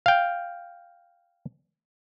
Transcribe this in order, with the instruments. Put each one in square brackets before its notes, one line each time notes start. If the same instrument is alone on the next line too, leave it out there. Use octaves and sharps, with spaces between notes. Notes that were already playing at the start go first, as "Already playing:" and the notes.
[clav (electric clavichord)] F5 G5